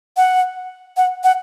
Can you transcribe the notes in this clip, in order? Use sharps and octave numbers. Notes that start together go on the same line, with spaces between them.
F#5
F#5
F#5